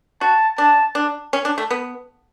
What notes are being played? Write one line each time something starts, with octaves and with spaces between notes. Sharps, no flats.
F#4 A5
D4 A5
D4
C#4
D4
A3
B3